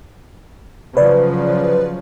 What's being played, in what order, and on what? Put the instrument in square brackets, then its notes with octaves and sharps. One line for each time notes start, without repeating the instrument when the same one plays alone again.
[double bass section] C#3 F3 F#3 [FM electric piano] B4 D5